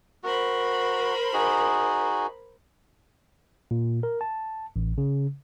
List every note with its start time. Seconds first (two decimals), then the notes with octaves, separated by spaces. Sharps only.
0.24 F#4 A#4 C5 B5
1.33 D#4 F#4 G#4
3.71 A#2
4.03 A#4
4.21 A5
4.76 A1
4.98 C#3